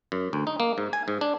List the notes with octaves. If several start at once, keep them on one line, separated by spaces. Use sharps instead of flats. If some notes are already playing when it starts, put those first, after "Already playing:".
F#2
D2
D#4
A#3
G#2
G#5
G#2
D4